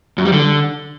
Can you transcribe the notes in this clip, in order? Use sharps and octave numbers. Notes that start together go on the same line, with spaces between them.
F#2
G3
D3